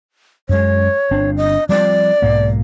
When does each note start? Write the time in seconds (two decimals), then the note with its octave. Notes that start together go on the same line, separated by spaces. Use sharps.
0.49 F#2 G#3 C#5
1.11 G1 C4 D4
1.37 D#5
1.69 F3 G3 C4 D5
2.22 B1 G#2 A#3